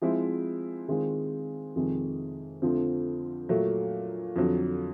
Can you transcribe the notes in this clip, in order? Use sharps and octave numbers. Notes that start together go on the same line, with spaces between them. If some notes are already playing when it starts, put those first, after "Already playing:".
F3 G#3 C4 E4
D#3 G#3 C4 F4 G#4
F2 C3 D#3 G#3
F2 D3 F3 A3 C4
A#2 F#3 A3
F2 D3 F#3